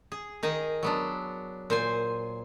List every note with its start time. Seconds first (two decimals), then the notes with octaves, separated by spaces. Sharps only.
0.12 G#4
0.43 D#3 D#4 G#4
0.83 F#3 B3 D4
1.70 A#2 C5 G#5